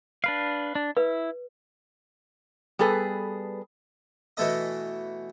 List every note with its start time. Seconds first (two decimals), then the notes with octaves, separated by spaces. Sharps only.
0.24 D4 B4 F5
0.75 D4
0.97 E4 B4
2.79 G3 B3 G#4 A4 B4
4.37 B2 E3 A3 A4 D#5